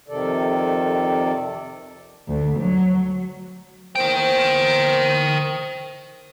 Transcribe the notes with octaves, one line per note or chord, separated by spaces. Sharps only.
F2 C3 D#3 A4 D5
D2
F#3
E2 A#3 A#4 C5 G5